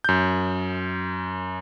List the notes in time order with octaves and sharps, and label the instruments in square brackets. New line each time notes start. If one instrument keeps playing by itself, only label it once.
[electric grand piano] F#2 G6